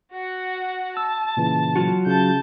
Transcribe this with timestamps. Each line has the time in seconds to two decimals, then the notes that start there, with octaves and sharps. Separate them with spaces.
0.13 F#4 F#5
0.97 A5 E6
1.37 A#2 C#3 E3
1.76 F#3 F4 F#4
2.06 C#3 A5 G6